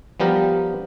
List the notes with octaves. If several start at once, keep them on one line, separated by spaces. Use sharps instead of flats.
F3 G3 B3 G4 A#4